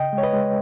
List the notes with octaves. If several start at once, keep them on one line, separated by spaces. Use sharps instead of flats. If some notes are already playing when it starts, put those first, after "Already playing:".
Already playing: C#3 D#5 G5
G#3
C#5
B4 D#5
G#3